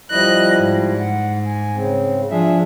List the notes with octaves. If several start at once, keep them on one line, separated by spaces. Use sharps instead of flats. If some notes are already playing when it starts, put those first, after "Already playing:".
F3 G3 E4 D#5 F#6
G#2
F#5
G#5
C#3 C4
F3 D4 G#4 E5